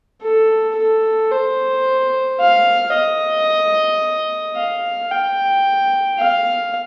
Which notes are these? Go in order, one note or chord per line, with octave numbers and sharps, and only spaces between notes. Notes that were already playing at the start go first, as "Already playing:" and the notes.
A4
A4
C5
F5
D#5
F5
G5
F5